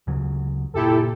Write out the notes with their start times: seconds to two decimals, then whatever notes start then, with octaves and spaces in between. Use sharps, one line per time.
0.07 D2 C#3 F#3
0.74 F#1 A#2 E4 G4 A4